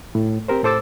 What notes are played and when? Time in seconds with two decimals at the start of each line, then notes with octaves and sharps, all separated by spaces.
0.15 A2
0.48 C4 G4 A#4 C5
0.64 A2 A4 C5 D6 E6 A6